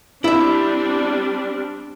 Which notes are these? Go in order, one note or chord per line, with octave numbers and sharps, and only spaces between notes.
G3 C4 D4 E4 E5